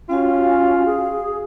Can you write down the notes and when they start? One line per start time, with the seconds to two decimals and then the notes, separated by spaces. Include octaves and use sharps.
0.09 C#4 F4 F#4 F5 G5
0.85 G#4